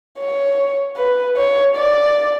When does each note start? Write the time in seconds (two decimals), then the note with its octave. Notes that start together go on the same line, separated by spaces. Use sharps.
0.19 C#5
0.97 B4
1.37 C#5
1.76 D5